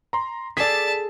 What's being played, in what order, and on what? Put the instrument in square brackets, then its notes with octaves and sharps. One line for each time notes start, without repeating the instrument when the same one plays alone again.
[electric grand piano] A#5 C6
[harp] G#4 A4 [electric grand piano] D5 B6 [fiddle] A5